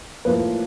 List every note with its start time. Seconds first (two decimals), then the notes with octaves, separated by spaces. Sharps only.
0.25 A2 F3 A#3 B4